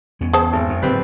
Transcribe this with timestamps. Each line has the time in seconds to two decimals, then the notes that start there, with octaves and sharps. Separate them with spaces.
0.20 E2 B3 C#4
0.33 G#4 C5 A5
0.53 G#1
0.69 F#2
0.82 F#1 A2 C4 G4 B4